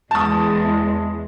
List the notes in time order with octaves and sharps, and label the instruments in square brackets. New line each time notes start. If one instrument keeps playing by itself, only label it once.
[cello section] E2 G#3 [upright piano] A5 D#6